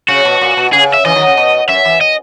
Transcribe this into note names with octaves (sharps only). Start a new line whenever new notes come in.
C#3 F#4
B2
A#2
B2
C#3 G#4
E5
C#3 E3 D#5
D#3 F#3
C#3
B2
F#2 E5
E3
D#5